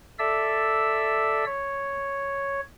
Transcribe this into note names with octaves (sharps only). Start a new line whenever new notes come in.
A4 D5 E5 E6
C#5